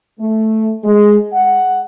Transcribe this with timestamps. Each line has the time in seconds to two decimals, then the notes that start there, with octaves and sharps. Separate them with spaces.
0.20 A3
0.84 G#3
1.33 F#5